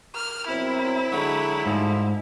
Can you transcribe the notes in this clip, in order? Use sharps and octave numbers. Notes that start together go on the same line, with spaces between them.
A#4 F6
B2 F#3 C4 E4
D3 F#3 G#3
D2 G#2 F3 G3 A3